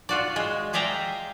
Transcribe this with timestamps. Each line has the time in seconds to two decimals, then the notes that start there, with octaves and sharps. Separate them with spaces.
0.09 F4 F#4 D5
0.36 G#3
0.73 G#4 D5 E5 F5 G5 A#5